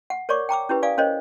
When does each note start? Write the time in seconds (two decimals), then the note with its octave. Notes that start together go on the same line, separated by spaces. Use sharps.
0.10 F#5
0.29 A#4 C#5 D5 C#6 D6
0.49 G5 A#5 D6 E6
0.69 C#4 E4 G4 B4
0.83 D5 F5 G#5 D#6
0.98 C#4 A#4 C5 C#5 D#5